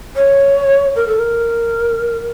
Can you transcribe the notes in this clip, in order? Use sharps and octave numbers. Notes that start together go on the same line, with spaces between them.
C#5
A#4
A4
A#4